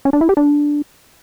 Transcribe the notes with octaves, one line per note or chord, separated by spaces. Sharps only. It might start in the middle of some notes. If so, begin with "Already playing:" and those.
C#4
D4
E4
G4
D4